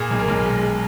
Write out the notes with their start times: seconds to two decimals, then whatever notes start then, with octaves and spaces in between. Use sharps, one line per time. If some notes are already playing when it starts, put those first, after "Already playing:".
Already playing: A#2 G#4
0.11 B1
0.19 A#4
0.28 B1
0.45 G#3
0.63 G#3